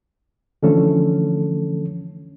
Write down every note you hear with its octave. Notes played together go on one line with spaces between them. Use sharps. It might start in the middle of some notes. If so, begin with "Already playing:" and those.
D3 E3 F3 A3 C#4 A4